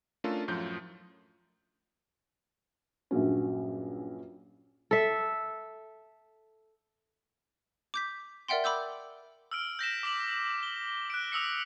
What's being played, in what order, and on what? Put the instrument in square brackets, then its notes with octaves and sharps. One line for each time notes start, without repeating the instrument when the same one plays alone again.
[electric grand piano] A3 C#4 D4 F4 A4 A#4
F#2 A2 F3 G6
[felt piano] A#1 G2 F#3 C#4
[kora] A4 E5
[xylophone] D6 G6 B6
A#4 D5 E5 F#5 G5 C6
B5 D6 E6 G6
[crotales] E6 F6 D7
G6 A#6 B6 E7
D6 B6 F#7
G7
F#6 D7
D#6 E6 B6 C#7